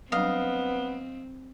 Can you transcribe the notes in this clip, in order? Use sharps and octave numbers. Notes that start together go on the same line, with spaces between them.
F#3 G3 B3 C4 D4 D#5 F5